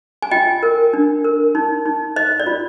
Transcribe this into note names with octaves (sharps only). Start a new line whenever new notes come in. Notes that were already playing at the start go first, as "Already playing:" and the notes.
G#5
F4 D#5 G5
A#4
D4
A#4
D#4
D#4
C5 D#5
D5
F4